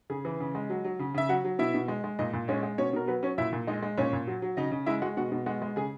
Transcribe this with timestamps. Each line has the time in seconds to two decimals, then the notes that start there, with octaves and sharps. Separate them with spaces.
0.10 C#3 G#4
0.25 E3
0.40 C#3
0.55 G#3
0.70 F#3
0.85 F#3
0.99 C#3
1.14 C#3 E5
1.29 F#3 F#4 F#5
1.45 F#3
1.59 B2 E4 E5
1.74 B2
1.88 G#3
2.04 G#3
2.19 A#2 D#4 D#5
2.33 A#2
2.48 G#3 C#4 C#5
2.63 G#3
2.78 B2 C#4 C#5
2.93 B2 A#4
3.08 F#3 B3 B4
3.23 F#3 C#4 C#5
3.38 A#2 E4 E5
3.53 A#2
3.67 G#3 D#4 D#5
3.83 G#3
3.97 A#2 C#4 C#5
4.13 A#2
4.27 F#3
4.42 F#3
4.57 C#3 D#4 D#5
4.71 C#3
4.86 G#3 E4 E5
5.02 G#3 F#4 F#5
5.17 B2 F#4 F#5
5.32 B2
5.46 G#3 F#4 F#5
5.62 G#3
5.76 C#3 G#4 G#5